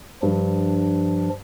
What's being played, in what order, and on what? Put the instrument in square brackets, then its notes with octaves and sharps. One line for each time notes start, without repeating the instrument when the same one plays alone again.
[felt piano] G2 [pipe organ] F3 D4